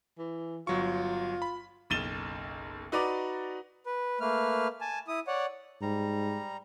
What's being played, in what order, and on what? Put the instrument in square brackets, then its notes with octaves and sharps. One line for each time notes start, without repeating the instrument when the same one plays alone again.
[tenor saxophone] E3
[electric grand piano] G1 F#3 C#6 [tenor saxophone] F4
[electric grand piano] B5
[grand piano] F#1 B1 A6 D#7 E7 G7
D#4 F#4 B4 D5 A#5 D6
[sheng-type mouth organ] B4
A3 A#3 B4 F6
G#5 A5
E4 D#6
C#5 D5 F#5
[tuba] G#2 [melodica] G3 A#5